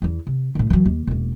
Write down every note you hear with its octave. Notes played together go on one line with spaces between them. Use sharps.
E2 E3
C3
A2 D3
E3 F#3
D#2 A#3
E1 A#3